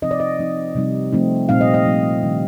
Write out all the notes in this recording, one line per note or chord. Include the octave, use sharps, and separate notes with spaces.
C3 F3 C4 D#4 D#5
D5
D#5
F3 C4 D#4
C3 G3 C4 D#4
F3 A3 C4 D#4
A#2 G3 C4 D#4 F5
D#5
D#5
F3 A3 D#4
C3 D#3 G3 D4